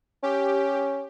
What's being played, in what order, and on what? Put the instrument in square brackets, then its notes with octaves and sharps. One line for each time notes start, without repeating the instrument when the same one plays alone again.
[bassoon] C#4 [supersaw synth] G4